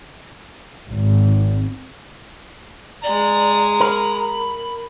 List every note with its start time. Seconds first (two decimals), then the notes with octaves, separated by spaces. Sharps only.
0.88 G#1
3.03 G#3 D5 A#5
3.80 A#4 B5